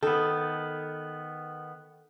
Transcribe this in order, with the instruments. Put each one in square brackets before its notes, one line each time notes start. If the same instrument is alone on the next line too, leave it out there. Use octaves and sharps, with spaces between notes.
[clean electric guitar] D#3 B3 [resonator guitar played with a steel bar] A4